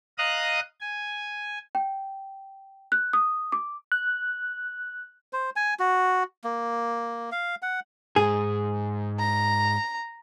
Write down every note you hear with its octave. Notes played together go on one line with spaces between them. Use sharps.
D#5 F5 A#5 D#6 F#6
G#5
G5
F#6
D#6
D6
F#6
C5
G#5
F#4
A#3
F5
F#5
G#2 G#4
A#5